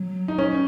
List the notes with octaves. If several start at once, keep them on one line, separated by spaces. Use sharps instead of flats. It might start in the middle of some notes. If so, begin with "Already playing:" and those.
Already playing: F#3
D#4
C#4